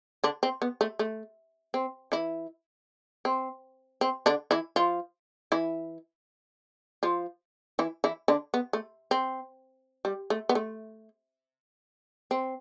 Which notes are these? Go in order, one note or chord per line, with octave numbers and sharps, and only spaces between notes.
D3 D4
C4
B3
A3
A3
C4
E3 E4
C4
C4
D3 D4
E3 E4
F3 F4
E3 E4
F3 F4
E3 E4
E3 E4
D3 D4
B3
A3
C4
G3
A3
B3
A3
C4